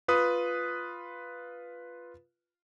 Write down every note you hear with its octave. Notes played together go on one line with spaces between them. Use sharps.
F4 B4 D#6